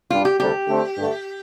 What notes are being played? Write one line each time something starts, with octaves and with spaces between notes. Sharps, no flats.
G2 G3 D4 F4
G4
D2 C3 G3 D4 G4 A4
D3 A3 C4
G2 D3 A3